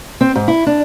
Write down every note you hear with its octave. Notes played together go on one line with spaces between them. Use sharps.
C4
G#2
E4
D4